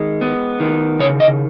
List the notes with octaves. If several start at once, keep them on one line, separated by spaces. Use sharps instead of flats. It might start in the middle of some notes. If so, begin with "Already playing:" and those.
Already playing: D#3 G#3
B3
D#3
C#3 C#5
D#5